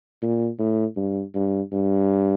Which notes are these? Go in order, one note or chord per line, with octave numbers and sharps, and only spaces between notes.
A#2
A2
G2
G2
G2